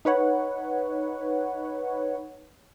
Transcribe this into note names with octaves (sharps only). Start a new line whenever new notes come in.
D#4 B4 C#5 F#5